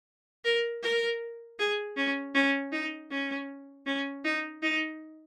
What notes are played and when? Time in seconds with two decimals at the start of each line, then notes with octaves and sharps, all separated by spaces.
0.45 A#4
0.82 A#4
1.59 G#4
1.97 C#4
2.35 C#4
2.72 D#4
3.11 C#4
3.86 C#4
4.24 D#4
4.63 D#4